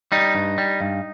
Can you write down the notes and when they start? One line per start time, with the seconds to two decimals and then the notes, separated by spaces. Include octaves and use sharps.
0.12 G3 D#4
0.35 G2
0.58 G3
0.81 G2